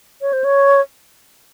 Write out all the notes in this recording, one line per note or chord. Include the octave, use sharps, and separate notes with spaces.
C#5
C5
C#5